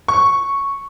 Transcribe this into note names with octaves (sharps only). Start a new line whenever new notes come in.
C#6